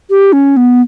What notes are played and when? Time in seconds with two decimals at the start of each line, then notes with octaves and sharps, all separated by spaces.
0.10 G4
0.33 C#4
0.57 B3